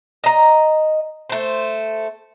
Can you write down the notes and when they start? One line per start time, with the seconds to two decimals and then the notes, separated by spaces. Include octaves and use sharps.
0.24 D#5 A#5
1.29 A3 C5